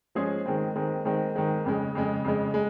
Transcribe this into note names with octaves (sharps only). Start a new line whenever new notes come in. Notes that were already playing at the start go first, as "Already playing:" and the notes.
F3 G#3 C#4 G#4 C5
D#3 G#3 C4
D#3 G#3 C4
D#3 G#3 C4
D#3 G#3 C4
F2 C#3 G#3
F2 C#3 G#3
F2 C#3 G#3
G#3